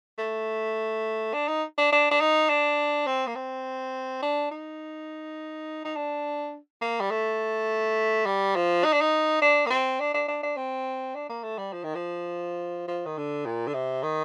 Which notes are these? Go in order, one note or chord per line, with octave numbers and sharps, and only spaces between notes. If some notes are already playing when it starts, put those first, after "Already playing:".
A3
D4
D#4
D4
D4
D4
D#4
D4
C4
A#3
C4
D4
D#4
D#4
D4
A#3
G3
A3
G3
F3
D#4
D4
D#4
D4
A#3
C4
D4
D4
D4
D4
C4
D4
A#3
A3
G3
F3
D#3
F3
F3
D#3
D3
A#2
D3
C3
D#3